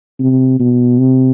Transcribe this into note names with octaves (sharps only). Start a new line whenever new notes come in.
C3
B2
C3